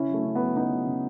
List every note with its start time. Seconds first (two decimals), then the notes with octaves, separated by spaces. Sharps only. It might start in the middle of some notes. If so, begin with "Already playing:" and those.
Already playing: C#3 C#4 E4
0.09 F#3 A3
0.25 C#3
0.35 F#3 B3
0.55 C#3 B3 D#4
0.71 F#3
0.87 C#3